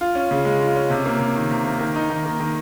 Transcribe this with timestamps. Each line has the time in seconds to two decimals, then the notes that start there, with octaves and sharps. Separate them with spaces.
0.01 F4
0.15 C#4
0.31 C#3
0.45 G#3
0.60 F4
0.76 C#4
0.90 C3
1.06 A#3
1.20 C3
1.35 D#3
1.51 C3
1.65 A#3
1.81 D#3
1.96 D#4
2.10 D#3
2.25 A#3
2.40 D#3